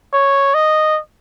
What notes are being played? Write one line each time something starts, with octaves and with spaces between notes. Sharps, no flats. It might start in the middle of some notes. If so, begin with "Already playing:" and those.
C#5
D#5